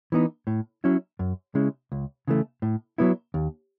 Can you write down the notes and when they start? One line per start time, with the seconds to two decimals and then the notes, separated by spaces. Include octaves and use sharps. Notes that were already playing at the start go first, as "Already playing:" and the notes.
0.12 E3 B3 D#4
0.47 A2
0.84 F#3 C#4 E4
1.19 F#2
1.55 C#3 G#3 C#4 E4
1.92 C#2
2.28 C#3 E3 A3
2.62 A2
2.98 F#3 B3 E4
3.34 D#2